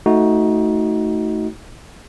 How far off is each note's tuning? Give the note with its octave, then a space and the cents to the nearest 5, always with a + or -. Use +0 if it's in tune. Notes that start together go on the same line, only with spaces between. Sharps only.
A3 +0 D#4 +20 F#4 +0